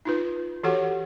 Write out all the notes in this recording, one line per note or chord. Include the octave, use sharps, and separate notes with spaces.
D#4 F4 B4
E3 F#4 G4 A4 C#5 F#5